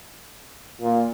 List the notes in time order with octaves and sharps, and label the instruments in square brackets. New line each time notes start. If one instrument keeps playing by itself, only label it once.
[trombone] A#2